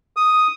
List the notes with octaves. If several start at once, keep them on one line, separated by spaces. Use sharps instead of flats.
D#6